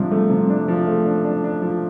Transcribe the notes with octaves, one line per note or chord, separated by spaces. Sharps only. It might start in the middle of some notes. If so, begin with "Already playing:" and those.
Already playing: C3 F3 G3 D4
A3
C3
D4
F3
A3
D4
D4
D4
F3